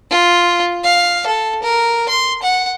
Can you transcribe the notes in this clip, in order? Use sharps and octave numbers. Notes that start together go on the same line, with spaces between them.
F4
F5
A4
A#4
C6
F#5